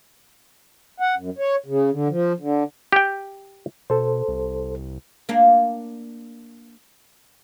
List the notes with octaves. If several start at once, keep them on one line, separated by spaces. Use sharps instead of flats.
F#5
F#2
C#5
C#3
D3
F3
D3
G4 G5
B2 A4 C5
C2
A#3 D4